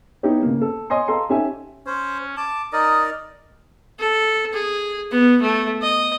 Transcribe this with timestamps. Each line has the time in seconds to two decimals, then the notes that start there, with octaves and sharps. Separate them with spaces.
0.23 B3 D#4 E4 G4 C#5
0.42 C#3 A#3
0.61 A4
0.90 C#5 D#5 G#5 C6
1.08 A4 F5 A#5 C6
1.29 C#4 D#4 G4 A4 E5 G#5
1.86 C#4 C5
2.37 A5 D6
2.73 D#4 A#4 D5 D#5
3.99 A4
4.53 G#4
5.11 B3
5.41 A3
5.82 D#5